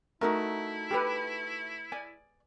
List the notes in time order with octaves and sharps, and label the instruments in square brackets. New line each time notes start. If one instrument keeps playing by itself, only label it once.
[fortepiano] A3 [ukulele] D#4 F#4 A#4 [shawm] E4
[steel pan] G4 A4 B4
[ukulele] D5 [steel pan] G#5